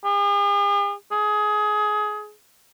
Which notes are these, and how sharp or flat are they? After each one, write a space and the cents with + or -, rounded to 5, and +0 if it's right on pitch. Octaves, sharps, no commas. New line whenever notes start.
G#4 -45
G#4 +20